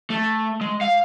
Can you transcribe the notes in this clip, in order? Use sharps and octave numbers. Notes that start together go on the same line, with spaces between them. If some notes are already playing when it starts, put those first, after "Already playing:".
A3
G#3
F5